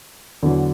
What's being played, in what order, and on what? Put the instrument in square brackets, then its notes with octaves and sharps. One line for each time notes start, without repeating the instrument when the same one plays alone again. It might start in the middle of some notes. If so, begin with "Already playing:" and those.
[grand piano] E2 D3 F#3